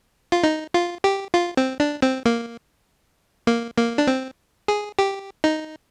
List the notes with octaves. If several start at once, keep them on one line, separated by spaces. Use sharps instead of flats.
F4
D#4
F4
G4
F4
C4
D4
C4
A#3
A#3
A#3
D4
C4
G#4
G4
D#4